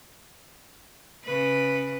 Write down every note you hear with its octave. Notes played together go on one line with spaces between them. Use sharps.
C#3 B4